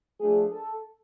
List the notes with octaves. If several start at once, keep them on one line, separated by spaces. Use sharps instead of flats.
F3 A3 D4 G#4
A4